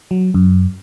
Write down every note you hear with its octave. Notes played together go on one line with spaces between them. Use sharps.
F#3
F#2